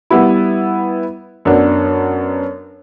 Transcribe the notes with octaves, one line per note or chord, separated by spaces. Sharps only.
G3 B3 E4
F#2 B3 D4